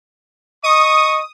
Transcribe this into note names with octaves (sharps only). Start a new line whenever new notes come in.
D#5 C#6 D#6